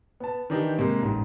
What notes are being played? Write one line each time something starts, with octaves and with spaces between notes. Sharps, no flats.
B3 A5
D#3 E3 D4 D#4 G4
C3 G#3 A#3
A1 G#2